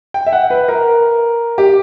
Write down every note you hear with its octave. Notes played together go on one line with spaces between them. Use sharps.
G5
E5
F#5
B4
A#4
G4